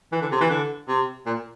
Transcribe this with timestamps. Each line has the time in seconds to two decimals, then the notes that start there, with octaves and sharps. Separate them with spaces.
0.12 E3
0.22 D3
0.32 C3
0.41 E3
0.50 D3
0.88 C3
1.26 A#2